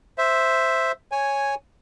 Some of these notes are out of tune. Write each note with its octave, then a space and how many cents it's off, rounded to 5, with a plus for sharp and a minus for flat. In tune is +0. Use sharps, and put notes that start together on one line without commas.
C5 +0 E5 +0
C#5 +0 G#5 -5